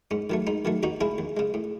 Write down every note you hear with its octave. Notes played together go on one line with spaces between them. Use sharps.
G#2 C#4
D#3 F#3 A3
G#2 D#4
D#3 F#3 A3
D#2 D#4 F#4
C#3 G#3 E4 G#4
D#2
C#3 G#3
A2